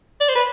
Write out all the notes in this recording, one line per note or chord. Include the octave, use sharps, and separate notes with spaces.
D5
C5
B4